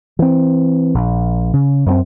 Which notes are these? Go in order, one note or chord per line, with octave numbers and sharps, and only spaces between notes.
E3 C4
A#1
C#3
F#2 G#3 C4